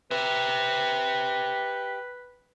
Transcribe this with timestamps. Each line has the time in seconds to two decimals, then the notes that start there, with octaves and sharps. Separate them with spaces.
0.11 G4 B4 E5